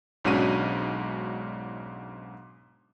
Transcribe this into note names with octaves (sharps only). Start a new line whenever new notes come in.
B1 G#2 C#4 D4 F#4 D#7